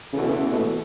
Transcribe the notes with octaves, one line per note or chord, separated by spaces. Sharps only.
E2 C#3 E3 A3 F#4 A4
B2
C#3
B2
A2